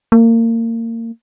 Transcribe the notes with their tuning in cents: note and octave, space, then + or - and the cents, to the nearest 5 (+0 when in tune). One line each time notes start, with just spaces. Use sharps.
A#3 -30